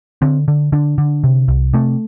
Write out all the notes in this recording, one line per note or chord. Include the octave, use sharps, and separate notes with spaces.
D3 C4
D3
D3 D4
D3
C3
C2
C3 A3